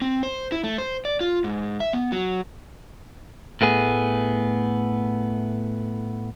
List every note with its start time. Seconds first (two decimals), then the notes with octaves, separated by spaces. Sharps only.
0.02 C4
0.23 C5
0.52 E4
0.64 A3
0.78 C5
1.05 D5
1.21 F4
1.44 G#2
1.80 E5
1.93 B3
2.12 F#3
3.61 A2 A3 B3 G#4